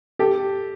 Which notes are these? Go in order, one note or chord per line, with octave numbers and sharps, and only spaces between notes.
G4 A4